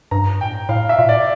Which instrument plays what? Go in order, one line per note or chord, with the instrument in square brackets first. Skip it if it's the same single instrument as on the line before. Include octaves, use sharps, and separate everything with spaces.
[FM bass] G2 [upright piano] A#5
[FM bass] A2 [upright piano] G5
[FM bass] A2 [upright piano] F5
[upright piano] E5
[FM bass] A#2
[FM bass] A2 [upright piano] D5
[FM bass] A#2